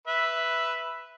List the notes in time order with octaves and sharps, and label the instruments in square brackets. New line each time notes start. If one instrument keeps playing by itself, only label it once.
[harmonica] B4 E5